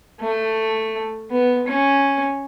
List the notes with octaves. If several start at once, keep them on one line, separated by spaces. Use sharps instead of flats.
A3
B3
C#4